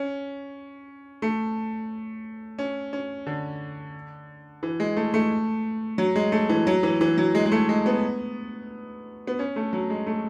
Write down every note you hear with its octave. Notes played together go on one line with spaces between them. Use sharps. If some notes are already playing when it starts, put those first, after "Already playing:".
Already playing: C#4
A3
C#4
C#4
D3
E3
G#3
A3
A3
F#3
G#3
A3
E3
F#3
E3
E3
F#3
G#3
G#3
A3
G#3
B3
B3
C#4
A3
F#3
G#3
A3